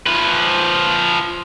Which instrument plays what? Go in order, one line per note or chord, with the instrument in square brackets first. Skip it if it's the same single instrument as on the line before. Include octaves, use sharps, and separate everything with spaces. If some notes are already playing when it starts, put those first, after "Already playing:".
[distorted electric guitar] F3 B4